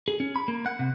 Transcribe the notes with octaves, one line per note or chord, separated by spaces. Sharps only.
G#4
C#4
B5
A#3
F#5
C3